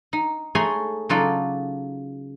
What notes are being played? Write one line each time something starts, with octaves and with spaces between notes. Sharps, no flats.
D#4
A3 G#4 C#5 G#5 A#5 C6
C#3 F#3 D#4 F4 A4 D5